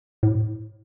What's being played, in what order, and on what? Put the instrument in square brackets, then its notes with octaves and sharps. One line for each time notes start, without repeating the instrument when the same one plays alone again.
[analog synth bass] A2